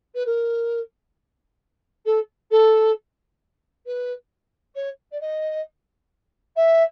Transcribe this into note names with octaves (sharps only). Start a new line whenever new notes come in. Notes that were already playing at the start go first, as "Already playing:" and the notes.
B4
A#4
A4
A4
B4
C#5
D5
D#5
E5